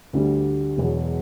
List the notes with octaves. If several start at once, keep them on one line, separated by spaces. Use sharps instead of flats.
D2 D3 G3
E1 E2 B2 F#3